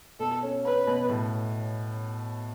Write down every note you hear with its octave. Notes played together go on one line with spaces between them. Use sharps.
B2 A4
C#4
C#4 B4
B2
A2